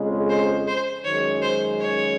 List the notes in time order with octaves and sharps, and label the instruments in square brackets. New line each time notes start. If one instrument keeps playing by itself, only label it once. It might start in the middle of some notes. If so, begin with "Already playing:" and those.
Already playing: [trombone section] F2 C#3 G#3
[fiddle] C5
C5
[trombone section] F#2 D#3 G#3 C#4 [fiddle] C#5
[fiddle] C5
C#5